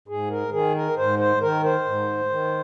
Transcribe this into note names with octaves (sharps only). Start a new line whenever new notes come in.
G#2 G#4
A#4
D#3 G#4
A#4
G#2 C5
C5
D#3 A#4
C5
G#2
D#3